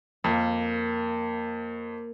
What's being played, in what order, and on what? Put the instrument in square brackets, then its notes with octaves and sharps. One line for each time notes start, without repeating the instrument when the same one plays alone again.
[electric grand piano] F2 [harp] A#3